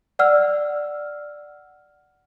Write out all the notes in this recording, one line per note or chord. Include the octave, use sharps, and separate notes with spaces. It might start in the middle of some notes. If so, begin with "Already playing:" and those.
D5 F#5 E6 F6